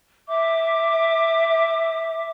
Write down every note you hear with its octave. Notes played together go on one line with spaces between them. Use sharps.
E5 D6